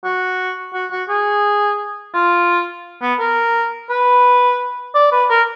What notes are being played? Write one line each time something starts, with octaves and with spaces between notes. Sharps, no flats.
F#4
F#4
F#4
G#4
F4
B3
A#4
B4
D5
B4
A#4